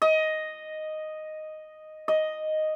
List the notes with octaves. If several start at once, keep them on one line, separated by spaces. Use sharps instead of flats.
D#5
D#5